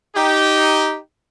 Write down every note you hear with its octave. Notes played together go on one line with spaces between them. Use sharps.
D#4 G4